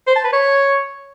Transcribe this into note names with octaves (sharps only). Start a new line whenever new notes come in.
C5
A5
B4
C#5